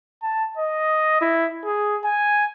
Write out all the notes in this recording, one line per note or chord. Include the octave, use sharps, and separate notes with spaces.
A5
D#5
E4
G#4
G#5